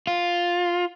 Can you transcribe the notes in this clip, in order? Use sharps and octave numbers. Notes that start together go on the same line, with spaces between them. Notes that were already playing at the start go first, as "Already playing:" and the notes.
F4